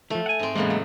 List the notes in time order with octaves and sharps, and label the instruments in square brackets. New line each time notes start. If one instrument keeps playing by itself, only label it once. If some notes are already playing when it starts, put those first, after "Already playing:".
[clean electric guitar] E3 F3 [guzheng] A3
[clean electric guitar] F#5 G#5
[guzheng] G#2 C4
[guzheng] E2 A2 C#3 [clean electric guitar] G#3 A#3 B3
[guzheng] F#3